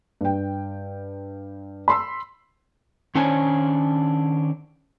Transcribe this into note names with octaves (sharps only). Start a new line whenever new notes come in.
G2 G5
B5 C6 E6
D#3 C#4 D4 C5 C#5 G#5